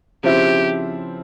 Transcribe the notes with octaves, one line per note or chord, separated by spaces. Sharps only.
C#3 F3 C4 E4 G4